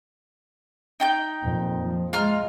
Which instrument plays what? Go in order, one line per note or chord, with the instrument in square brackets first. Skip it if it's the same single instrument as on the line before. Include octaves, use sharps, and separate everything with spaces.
[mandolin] D#4 G5 G6
[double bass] F2 A#2
F3
[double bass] G#3 [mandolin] F4 A#5 F6